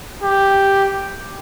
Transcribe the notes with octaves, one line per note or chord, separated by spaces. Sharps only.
G4